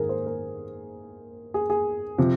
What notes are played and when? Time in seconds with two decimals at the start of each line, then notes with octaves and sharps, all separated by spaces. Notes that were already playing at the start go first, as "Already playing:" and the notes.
Already playing: G#2 D#3 A#3 G#4 A#4
0.09 C5
0.26 A#4
1.54 G#4
1.70 G#4
2.18 C3 F3